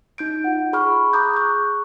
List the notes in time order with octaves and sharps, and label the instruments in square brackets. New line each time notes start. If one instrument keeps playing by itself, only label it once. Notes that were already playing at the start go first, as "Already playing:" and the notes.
[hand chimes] D#4 G6 D7
F4 F#5
G#4 B5 C#6 F6
G#4 A#5 D6 D#6 F#6 G6
C#6 F#6